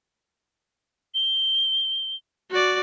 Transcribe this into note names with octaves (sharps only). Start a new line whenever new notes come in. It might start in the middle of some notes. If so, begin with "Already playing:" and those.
G7
F#4 D5